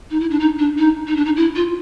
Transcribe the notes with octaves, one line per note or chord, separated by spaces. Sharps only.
D#4
E4
D4
D#4
D4
D#4
D#4
D4
D#4
E4
F4